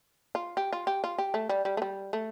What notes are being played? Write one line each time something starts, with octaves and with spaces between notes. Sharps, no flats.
F4
G4
F4
G4
F4
G4
A3
G3
G3
A3
G3
A3